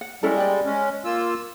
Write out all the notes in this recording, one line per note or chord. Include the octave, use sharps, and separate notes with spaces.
F#5
G3 G#3 C#4 E4 A4
D5 G5
G#3 C#4
A#3 F4 E6